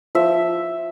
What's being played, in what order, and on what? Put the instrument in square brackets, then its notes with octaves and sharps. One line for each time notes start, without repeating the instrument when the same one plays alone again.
[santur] F3 E5